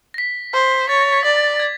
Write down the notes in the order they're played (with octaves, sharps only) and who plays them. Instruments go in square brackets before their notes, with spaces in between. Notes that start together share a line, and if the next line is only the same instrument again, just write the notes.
[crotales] A#6
B6
[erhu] C5
[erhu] C#5 [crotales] A6
[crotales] A#6
B6
[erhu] D5 [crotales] A6
[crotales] G#6